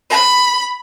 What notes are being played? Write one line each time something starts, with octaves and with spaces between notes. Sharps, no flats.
B5